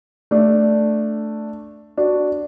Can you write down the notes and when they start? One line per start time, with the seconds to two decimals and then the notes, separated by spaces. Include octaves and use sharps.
0.31 A3 D4
1.97 D4 F#4